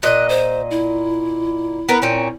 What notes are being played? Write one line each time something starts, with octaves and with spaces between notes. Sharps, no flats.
A#2 D#5 F#6
C5
E4
B3 A#4 B4
A#2 C4 C#4